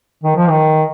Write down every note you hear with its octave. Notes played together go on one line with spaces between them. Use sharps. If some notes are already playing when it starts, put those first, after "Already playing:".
D#3
F3
D#3